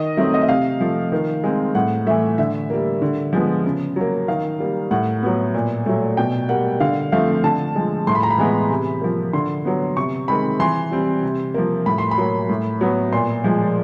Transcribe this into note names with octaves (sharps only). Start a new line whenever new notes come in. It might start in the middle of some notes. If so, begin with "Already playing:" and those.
Already playing: D#3 D#5
F#3 A3 C4 E5
D#5
E5
C3 F5
F3 A3
D#3
G#3 C4
A2 F#5
E3 A3 E5
D3 E5
G3 A#3
D3
F3 G#3 B3
C#3
F#3 A#3
D#3 F5
G3 A#3
A2 F#5
F#3 B3
A#2
F#3 A3
B2 G5
G3 A#3 F#5
D3 F5
F3 A3 C4 F5
D3 A5
F3 G#3
A2 C6
B5
A#5
B5
E3 G#3 B3
C3
F3 A#3
D3 C6
F#3 B3
C3 C#6
D#3 G#3 C4 B5
E3 C6
G3 C4
C3
F3 A#3
A2 B5
C6
B5
F#3 A#3
A2
F#3 B3
A#2 C6
F3 G#3